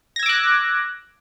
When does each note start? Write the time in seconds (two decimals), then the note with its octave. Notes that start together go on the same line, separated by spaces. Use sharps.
0.16 A#6
0.19 G#6
0.23 E6
0.26 D6
0.29 F#6